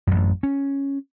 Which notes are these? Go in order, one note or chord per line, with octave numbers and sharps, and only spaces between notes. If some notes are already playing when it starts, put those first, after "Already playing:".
A1 F#2
C#4